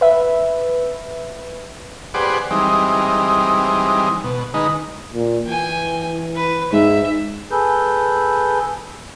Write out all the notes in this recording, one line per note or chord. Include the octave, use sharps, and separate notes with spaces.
B4 E5
G4 G#4 B4 C5 D5 F#5
E3 G3 G#3 C4 D#4
B2
D#3 G#3 D#4 B4
A#2
E3 G5 G#5
B4
G#2 E5
G#4 A4 B4 G6